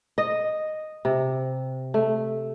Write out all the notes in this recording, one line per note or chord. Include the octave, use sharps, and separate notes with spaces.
D#5
C3
A3